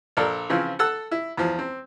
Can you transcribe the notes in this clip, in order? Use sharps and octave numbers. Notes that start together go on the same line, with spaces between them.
A#1 A4 A#4 D5
C#3 E3 F3 C4 F4
A4 F#5 A5 E6
E4
E2 F3
C4